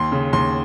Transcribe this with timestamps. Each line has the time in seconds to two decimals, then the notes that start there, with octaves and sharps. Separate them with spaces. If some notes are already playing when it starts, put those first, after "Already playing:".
Already playing: D#2 C6
0.12 C#3
0.33 D#2 C6